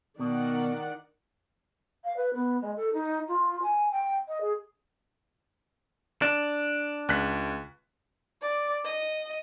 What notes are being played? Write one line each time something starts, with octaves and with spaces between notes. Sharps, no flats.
B2 D#3 D5 F#5
F5
B4
B3
G#3
A4
D#4
F4
G#5
G5
D#5
G#4
D4
C#2 F#6 B6
D5
D#5